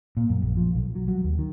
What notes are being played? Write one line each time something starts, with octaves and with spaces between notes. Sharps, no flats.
A#2
F#2
A#1
F3
B1
F#3
F#3
D#2
D#3